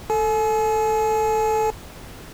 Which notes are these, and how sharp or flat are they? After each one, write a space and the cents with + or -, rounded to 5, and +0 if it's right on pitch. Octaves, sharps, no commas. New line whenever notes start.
A4 +5 G#5 +40